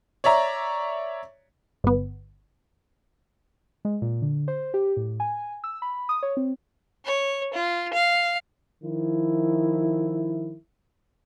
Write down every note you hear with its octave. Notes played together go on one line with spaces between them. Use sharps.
C#5 D5 E5 A#5
G1 B3
G#3
A#2
D3
C5
G4
A2
G#5
E6
B5
D#6
C#5
C4
C#5
F4
F5
D#3 F3 E4